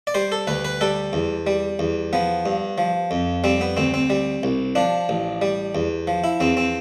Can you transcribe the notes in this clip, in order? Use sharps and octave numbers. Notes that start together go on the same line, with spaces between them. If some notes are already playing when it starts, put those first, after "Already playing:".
D5
G3 C5
A4
D2 B4
B4
G3 A4
E2
G3
E2
F3 B3
G2
F3
F2
G3 C4
B3
D2 C4
C4
G3
C2
F3 D4
A1
G3
E2
F3
E4
E2 C4
C4